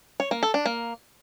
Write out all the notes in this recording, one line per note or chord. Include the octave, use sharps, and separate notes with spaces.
C#5
A#3
A4
D4
A#3